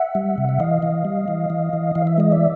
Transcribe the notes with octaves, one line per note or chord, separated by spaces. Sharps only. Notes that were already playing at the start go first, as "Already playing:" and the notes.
Already playing: E5 F#5
G3
C3
E5
E3 D#5 F5
E3
G3
E3
E3
E3
E3 F5
E5
G#3 D#5
D5 E5